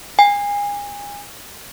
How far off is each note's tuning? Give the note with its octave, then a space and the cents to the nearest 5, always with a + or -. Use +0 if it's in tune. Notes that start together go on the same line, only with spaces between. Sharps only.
G#5 -30